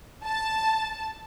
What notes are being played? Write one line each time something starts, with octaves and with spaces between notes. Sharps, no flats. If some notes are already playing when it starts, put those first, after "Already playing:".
A5